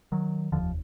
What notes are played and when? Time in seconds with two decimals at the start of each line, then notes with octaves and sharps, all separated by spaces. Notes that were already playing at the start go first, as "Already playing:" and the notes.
0.12 D#3 F#3
0.52 F1 D#2 D3 F3